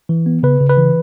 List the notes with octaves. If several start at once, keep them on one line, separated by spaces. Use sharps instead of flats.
E3
B3
C#3 B4
C#3
B4
E3